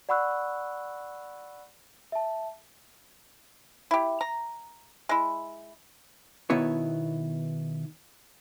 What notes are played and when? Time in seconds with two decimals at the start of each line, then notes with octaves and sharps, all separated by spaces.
0.09 D5 F#5 B5 C#6 E6 F#6
2.12 E5 A5
3.91 E4 G4
4.21 A#5
5.09 G#3 E4
6.50 B2 D#3 B3 E4 C#5